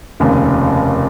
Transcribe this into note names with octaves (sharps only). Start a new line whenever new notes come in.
F1 D#2 C#3